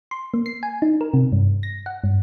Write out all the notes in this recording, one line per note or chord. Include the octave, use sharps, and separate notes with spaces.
C6
A#3
C7
G#5
D#4
A#4
C3
G2
A#6
F#5
G2